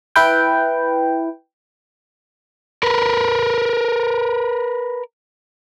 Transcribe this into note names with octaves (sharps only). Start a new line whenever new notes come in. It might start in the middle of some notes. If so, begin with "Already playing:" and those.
E4 B4 G5
A#4 B4